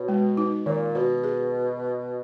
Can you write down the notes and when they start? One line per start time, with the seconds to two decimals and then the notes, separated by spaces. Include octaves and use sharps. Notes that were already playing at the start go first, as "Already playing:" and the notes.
Already playing: B2 C#5
0.08 G#3
0.37 D#4
0.66 A#2 D#3
0.95 B2 F#4
1.24 G#4